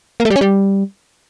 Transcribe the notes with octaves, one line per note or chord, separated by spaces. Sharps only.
A#3
A3
G3
C#4
G3